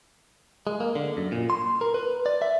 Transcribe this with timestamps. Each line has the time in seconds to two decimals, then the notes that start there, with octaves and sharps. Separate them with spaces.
0.67 G#3
0.80 A#3
0.95 D3
1.17 F#2
1.32 A#2
1.50 C6
1.81 A#4
1.94 B4
2.26 D5
2.42 E5